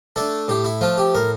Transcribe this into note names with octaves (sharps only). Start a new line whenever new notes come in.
A3 D4 A4
A2 G4
E4
F3 A3 F4
G4
A2 A#4